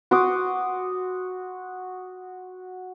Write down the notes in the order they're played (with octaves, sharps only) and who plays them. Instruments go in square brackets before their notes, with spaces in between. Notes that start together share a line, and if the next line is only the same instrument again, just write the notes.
[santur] F#4 C6 D6 D#6